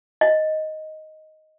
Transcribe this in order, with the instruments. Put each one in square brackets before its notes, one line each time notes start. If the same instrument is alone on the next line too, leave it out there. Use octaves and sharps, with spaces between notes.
[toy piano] D#5